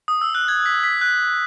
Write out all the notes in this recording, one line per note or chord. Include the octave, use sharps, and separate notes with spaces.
D#6
E6
F#6
G#6
B6
B6
F#6